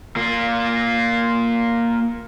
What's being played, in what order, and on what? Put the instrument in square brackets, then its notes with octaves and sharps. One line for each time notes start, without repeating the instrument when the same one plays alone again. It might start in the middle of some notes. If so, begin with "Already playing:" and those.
[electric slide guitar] A#3 F4